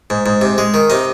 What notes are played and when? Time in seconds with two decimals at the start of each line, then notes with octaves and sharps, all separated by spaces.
0.10 G#2
0.26 G#2
0.41 C3
0.58 G#3
0.74 D#3
0.90 C3 D#4